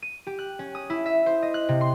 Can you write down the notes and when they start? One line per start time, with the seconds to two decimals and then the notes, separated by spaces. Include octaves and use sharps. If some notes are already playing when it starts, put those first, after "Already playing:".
0.02 D#7
0.27 G4
0.39 F#6
0.59 C#4
0.75 D#6
0.90 E4
1.06 E5
1.26 C5
1.42 D#5
1.54 F#6
1.69 C3
1.81 C6